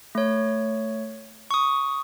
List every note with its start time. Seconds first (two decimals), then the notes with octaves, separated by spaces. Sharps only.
0.15 A3 C#5
1.51 C#6 D#6